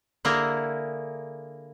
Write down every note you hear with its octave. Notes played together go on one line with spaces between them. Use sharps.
D3 A#3 E4 G#4 A#4